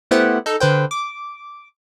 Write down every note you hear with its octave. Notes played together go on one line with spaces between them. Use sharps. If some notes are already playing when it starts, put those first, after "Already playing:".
A3 B3 E4 G4 C5 F#5
D#4 A4
D3 B4 C5 G5
D6